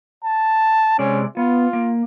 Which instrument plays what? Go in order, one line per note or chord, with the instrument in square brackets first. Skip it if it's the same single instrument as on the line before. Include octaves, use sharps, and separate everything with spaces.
[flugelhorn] A5
[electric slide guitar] C3 G#3 D5 [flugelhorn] C#4
[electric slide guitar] B3 [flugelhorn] F4
[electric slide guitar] A#3